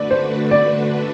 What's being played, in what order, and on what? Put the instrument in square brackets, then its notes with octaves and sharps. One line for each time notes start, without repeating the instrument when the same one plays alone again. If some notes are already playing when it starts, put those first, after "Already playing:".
Already playing: [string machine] D3 A3 D4 F#4 B4 [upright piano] D5
[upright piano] C5
D5